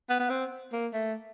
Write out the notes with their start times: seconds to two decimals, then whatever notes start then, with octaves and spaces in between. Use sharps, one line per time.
0.09 B3
0.19 B3
0.30 C4
0.72 A#3
0.93 A3